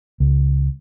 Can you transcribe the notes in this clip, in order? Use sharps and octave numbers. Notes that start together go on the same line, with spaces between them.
C#2